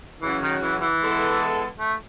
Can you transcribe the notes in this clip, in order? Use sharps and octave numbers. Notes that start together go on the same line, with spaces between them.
C#3 E3 F#3 C#4 F#4
D#3
E3
E3
G#3 B3 E4 A4
A3